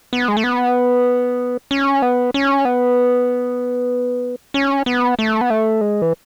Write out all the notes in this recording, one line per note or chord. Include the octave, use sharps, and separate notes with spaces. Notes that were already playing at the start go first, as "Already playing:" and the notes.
B3
G#3
A3
B3
C#4
B3
C#4
B3
C#4
B3
A3
B3
A3
G#3
E3